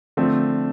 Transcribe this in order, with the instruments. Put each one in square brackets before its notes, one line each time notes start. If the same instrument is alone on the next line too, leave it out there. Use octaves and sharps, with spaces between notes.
[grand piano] D3 F3 A3 [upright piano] C4